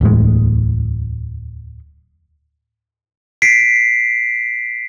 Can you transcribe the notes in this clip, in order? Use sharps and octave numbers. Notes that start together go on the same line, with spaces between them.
D1 E2 A2 G#3
B6 C7 D7